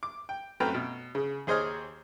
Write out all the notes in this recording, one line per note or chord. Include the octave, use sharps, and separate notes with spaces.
D6
G5
F#2 A3 C4 B4 G5 A#5
B2
C#3
D#2 G#4 C5 C#5 D#5 F6